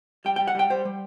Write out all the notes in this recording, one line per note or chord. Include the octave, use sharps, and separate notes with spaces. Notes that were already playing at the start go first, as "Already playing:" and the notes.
G3 G5
G3 G5
F#5
G3 G5
G3 C5
G3